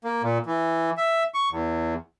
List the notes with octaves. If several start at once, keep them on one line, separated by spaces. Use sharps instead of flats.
A#3
A#2
E3
E5
C#6
E2